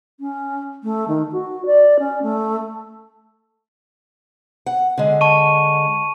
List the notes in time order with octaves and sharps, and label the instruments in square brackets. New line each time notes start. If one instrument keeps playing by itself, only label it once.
[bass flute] C#4
A3
D#3
F#4
D5
C#4
A3
[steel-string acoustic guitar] F#5
D3 G#3
[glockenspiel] A5 C#6 D#7